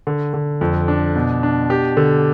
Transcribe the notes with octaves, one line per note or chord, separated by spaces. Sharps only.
D3
D3
F2
D4
B2
D4
G4
D3